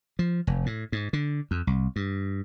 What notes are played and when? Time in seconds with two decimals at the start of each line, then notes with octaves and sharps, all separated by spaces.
0.19 F3
0.47 F1
0.66 A2
0.92 G#2
1.13 D3
1.51 F2
1.67 C2
1.96 G2